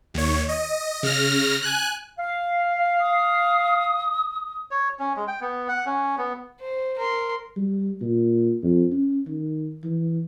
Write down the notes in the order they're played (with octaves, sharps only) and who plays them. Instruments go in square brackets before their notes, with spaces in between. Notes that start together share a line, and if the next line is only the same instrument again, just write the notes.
[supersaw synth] D#2 C#5
D#5
C#3 F6 A#6
G#5 F#6
[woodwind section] F5
[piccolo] D#6
[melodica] C#5
C#4
G#3
G5
B3
F#5
C#4
B3
[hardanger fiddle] C5
A#4 C6
[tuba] G3
A#2
F2
C#4
D#3
E3